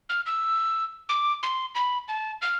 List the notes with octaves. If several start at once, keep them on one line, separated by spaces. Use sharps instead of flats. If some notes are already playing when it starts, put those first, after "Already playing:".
F6
E6
D6
C6
B5
A5
F6